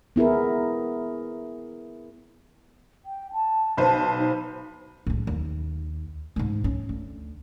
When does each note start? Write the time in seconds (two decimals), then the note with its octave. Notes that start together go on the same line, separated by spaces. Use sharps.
0.16 B3 E4 G#4 A#4
3.06 G5
3.33 A5
3.77 B1 B4 C5
4.19 D#4
5.07 A2 G#3
5.27 D#2
6.36 G#2 G#3
6.64 C#4
6.89 D2